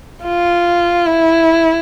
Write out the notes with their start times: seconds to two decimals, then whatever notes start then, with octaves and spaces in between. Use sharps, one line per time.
0.24 F4
1.07 E4